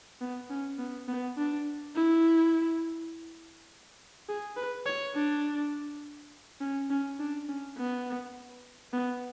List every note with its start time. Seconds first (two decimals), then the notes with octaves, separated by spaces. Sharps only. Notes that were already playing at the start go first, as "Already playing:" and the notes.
0.21 B3
0.50 C#4
0.79 B3
1.08 B3
1.38 D4
1.96 E4
4.29 G#4
4.57 B4
4.86 C#5
5.15 D4
6.61 C#4
6.90 C#4
7.20 D4
7.49 C#4
7.77 B3
8.93 B3